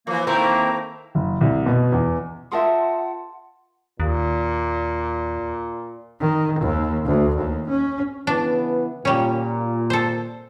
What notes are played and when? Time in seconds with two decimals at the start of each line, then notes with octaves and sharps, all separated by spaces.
0.07 E3 F3 A#3
0.27 D#3 A3 A#3 C4 E4 A#5
1.15 F#1
1.41 C2
1.66 B2
1.92 E2
2.52 F4 G#4 A#4 E5 F#5 A5 C6
4.00 D#2 A#2
6.20 D#3
6.59 D#2
7.06 D2
7.37 D#2
7.69 C#4
8.27 C#3 E3 B3 D4
9.05 A#2 G3 C#4
9.90 A4 C5